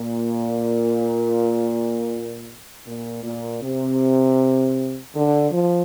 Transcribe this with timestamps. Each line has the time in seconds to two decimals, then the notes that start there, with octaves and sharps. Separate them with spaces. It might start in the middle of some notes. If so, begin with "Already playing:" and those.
Already playing: A#2
2.86 A#2
3.23 A#2
3.62 C3
5.14 D3
5.51 F3